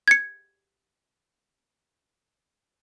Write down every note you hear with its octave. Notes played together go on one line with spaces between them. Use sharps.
G#6 C#7